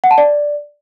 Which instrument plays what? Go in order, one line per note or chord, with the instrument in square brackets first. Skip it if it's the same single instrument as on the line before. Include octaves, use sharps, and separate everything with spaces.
[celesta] F#5
A5
D5